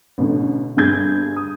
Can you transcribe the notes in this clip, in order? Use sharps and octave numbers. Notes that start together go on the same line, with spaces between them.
A1 B2 D3
G1 G2 G#4 G6 G#6
D#6